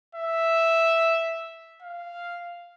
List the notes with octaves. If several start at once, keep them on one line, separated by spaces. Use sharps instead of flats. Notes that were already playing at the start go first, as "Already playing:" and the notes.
E5
F5